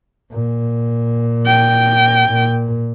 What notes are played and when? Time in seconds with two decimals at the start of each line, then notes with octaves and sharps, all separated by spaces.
0.32 A#2
1.46 G5
2.29 A#2